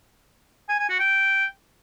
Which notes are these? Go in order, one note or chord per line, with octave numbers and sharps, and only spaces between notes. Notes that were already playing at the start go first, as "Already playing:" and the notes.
G#5
G#5
F#4
G5